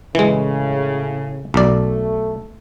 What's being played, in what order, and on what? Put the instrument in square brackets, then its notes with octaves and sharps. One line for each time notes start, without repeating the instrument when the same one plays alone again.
[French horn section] A2 C#3 [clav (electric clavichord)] E3 G#3
[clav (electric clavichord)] B1 D5 [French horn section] A3